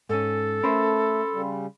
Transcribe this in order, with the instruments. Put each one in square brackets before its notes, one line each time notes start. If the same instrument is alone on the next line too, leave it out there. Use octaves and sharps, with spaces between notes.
[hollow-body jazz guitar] G#2 C#4 [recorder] A4
[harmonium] A3 [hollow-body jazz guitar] C#4 A#4 C5 [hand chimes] B5 C6 E6
[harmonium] C#3 G3